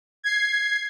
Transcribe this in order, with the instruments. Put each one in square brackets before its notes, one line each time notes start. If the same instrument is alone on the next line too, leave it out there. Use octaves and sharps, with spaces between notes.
[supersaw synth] G#6 C7